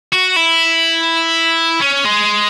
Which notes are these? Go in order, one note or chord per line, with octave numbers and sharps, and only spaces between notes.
F#4
E4
C#4
G#3